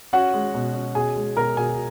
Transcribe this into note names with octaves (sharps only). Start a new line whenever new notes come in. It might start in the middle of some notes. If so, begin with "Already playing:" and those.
C#4 F#4 F#5
G#3
B2
C#4
B2 G#4 G#5
G#3
B2 A#4 A#5
B2 G#4 G#5